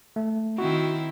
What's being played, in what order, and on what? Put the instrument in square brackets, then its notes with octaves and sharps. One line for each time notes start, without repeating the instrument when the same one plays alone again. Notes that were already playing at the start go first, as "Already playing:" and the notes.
[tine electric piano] A3
[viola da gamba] D#3 C4 E4 [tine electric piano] F#4